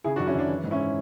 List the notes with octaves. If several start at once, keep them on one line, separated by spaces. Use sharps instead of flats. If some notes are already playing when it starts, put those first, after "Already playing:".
C#3 E4 G#4
D4 F#4
F#2
C#4 E4
F#2 D4
E3
G#2
C#4 E4